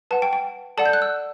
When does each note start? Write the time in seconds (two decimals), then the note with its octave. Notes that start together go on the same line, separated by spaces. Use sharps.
0.11 B4 F#5 A5
0.22 G5
0.33 G5
0.77 A4 D5 F#5 A5
0.86 G6
0.93 F#6
1.02 E6